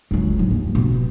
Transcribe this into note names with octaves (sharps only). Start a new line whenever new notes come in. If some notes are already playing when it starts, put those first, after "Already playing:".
C#2 F#3
G#2
D#2
B2